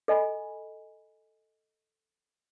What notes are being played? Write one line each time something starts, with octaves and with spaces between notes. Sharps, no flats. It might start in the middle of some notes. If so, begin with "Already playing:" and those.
A4 D#5 G#5 B5